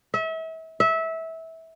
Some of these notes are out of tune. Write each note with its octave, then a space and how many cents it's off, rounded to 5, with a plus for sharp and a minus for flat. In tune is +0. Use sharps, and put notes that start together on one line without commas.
E5 -35
E5 -20